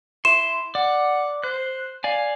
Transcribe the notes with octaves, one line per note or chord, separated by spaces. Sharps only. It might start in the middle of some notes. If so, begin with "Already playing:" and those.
E4 C6 E7
D5 F#5
C5 F#6
D5 F5 G#5